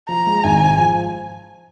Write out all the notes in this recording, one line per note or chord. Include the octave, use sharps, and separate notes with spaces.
F3 A#5
G#3
G#1 G#5
G#2
F3